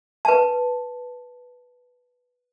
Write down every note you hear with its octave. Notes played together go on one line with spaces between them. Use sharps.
B4 A5